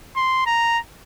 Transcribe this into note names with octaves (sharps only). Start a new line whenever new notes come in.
C6
A#5